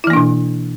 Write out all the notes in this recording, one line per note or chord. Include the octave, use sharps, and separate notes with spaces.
B2 E3 A#3 D4 E4